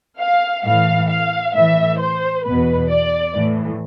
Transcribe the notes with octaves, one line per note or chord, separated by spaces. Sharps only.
F5
A2 E3 F5
F5
A2 E3 E5
C5
E2 B2 B4
D5
A2 E3